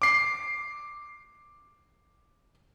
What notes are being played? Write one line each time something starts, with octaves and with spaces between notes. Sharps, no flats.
D6 C7